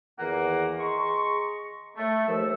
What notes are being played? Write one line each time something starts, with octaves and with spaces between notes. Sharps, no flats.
E2 A#2 D#3 E3 A#3 F#5
G#4 D#5 A#5 C6 C#6
A3
D#2 F3 E6